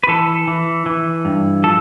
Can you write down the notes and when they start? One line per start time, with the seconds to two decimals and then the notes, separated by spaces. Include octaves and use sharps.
0.03 B4
0.08 E3 A4
0.48 E3
0.86 E3
1.25 G2
1.64 F3 A4